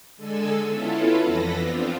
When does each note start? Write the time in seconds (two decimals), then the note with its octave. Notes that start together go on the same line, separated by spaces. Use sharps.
0.16 D3 G#3 A4 G#5 E6
0.66 B3 C#4 E4 F4 A4
1.21 F2 E3 A4 B4 B5 A#6
1.54 B3 C4 D4 F4